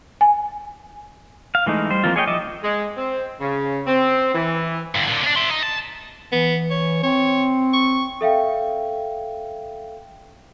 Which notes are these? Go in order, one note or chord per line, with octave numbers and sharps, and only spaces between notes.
G#5
F5
E3 G#3 A3 D#4
G3 C5
E3 F3 A#3 C4 F4
G#4 C#5 D#5 E5 G5
F3 D#5 E5 D6
G#3
C4
C#3
C4
E3
G2 D3
A#2 D3
C#4 D4
E5 C6
D#4
A5
E3 B3
C#5
C4 C#5
C#6
A4 E5 F5 G5